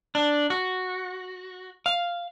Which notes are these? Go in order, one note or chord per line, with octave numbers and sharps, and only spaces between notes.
D4
F#4
F5